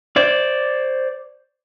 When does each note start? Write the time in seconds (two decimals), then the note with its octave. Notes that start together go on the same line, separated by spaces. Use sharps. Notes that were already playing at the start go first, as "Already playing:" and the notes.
0.16 C5 D5